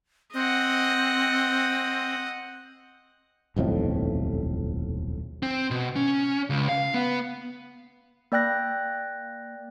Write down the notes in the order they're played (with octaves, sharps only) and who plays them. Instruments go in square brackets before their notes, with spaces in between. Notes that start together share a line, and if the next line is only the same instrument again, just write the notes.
[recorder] C4 [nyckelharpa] D#5 F#5
[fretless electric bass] D#1 B1 F2 A2
[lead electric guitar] C4
B2
C#4
C#2
F5
B3
[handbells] A#3 D5 G5 F#6 A#6